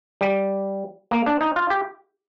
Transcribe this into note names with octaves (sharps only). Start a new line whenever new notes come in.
G3
A#3
D4
D#4
F4
G4